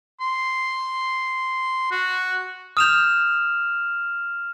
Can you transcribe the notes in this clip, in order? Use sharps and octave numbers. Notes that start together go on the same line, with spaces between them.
C6
F#4
D#6 F6 G6 E7 F7